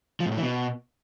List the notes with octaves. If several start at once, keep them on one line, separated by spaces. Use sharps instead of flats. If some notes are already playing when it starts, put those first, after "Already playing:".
F3
G#2
A2
E3
B2